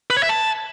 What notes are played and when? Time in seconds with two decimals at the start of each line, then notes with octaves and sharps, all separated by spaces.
0.10 B4
0.17 C#5
0.23 E5
0.29 A5